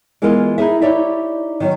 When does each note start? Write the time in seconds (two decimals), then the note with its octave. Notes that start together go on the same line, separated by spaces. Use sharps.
0.22 E3 G#3 B3 F4 A#4 D#5
0.58 D#4 E4 G#4 E5
0.82 D#4 E4 G4 C#5 D5 E5
1.60 D#3 F#3 C#4